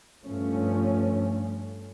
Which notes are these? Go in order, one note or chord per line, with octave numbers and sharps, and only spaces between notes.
G2 F3 A3 C#4